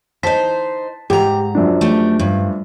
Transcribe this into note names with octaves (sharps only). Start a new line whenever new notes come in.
D#4 C5 A5 B6
G#2 G4 A#5
F#2 F3 D4
A3 G4
G2